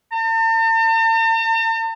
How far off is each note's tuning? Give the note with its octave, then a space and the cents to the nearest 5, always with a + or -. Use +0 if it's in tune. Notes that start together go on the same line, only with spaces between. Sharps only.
A5 +45